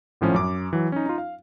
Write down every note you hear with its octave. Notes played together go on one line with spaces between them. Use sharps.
G#1 A2 F3 C#4
F#2 D6
E3 F#3
C#4 D#4
D#4 F4
F5